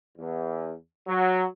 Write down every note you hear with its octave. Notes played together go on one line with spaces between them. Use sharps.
E2
F#3